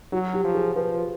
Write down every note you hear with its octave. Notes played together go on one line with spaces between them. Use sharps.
F#3 F#4
G4
F3
G#4
F3 B4